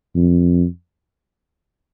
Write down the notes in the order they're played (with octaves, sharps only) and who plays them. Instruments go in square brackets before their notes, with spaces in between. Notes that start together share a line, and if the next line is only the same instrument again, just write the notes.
[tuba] F2